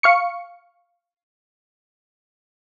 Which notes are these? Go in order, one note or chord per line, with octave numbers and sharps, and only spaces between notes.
F5 C#6 C#7